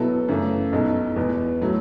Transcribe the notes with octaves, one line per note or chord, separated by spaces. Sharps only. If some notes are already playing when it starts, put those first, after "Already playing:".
Already playing: B2 F#3 B3 E4 A4
F#2 C#3 E3 A3
B1 B2 G#3 D#4 A4
E2 B2 G#3 B3
A2 F#3 A3